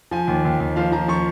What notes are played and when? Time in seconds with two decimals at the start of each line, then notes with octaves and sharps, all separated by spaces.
0.11 F3 G#5
0.28 D#2
0.45 D#2
0.60 D#2
0.76 F3 F5
0.92 F3 A#5
1.08 F3 C#6